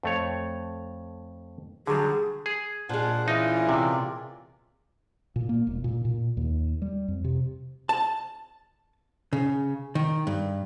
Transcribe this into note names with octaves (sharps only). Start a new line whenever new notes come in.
F2 A3 C#5
D3 F#3 G3 G#4
G#4
A#2 G#3 D4 C5 F#5
E3 C#4 D#4 F4 D5
C3
A#2
A#3
E1
A#2
A#2
D#2
G3
F2
C3
A5
C#3
D#3
G2